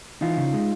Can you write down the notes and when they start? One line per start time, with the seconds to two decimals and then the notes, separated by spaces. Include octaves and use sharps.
0.21 E3 D#4 F4
0.37 C#3
0.54 G#3